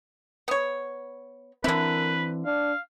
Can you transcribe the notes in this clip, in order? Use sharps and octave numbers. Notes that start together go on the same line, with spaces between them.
B3 C#5
D3 E3 C4 E4 A#4 B4
D4 F5